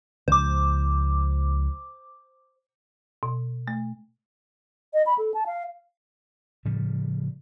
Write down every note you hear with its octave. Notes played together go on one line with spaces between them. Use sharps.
C#2 F3 C5 D6
B2
A3
D#5
B5
A4
A5
F5
A2 C#3 F3 G3